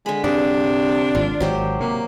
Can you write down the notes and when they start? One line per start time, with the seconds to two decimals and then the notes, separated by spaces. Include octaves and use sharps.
0.06 D3 G#3 B5
0.24 G2 C3 D4 G#4
1.15 G#1 A#2 F4
1.40 G#1 F#3 G4 C5
1.80 C3 A#3